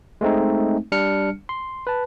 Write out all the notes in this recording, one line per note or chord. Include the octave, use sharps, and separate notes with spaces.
G#3 A3 C4 D#4
G3 D4 F6 C#7
C6
B4 A5